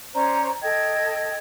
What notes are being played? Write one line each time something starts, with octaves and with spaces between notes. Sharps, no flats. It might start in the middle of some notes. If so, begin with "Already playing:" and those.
C#4 C5 D5 A#5
A4 D#5 G5 G#6